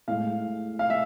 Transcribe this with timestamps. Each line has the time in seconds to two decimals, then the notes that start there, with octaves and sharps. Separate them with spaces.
0.08 A2 G#3 F5
0.79 F5
0.90 E5